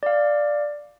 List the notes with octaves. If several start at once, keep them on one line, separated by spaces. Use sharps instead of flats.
D5 F5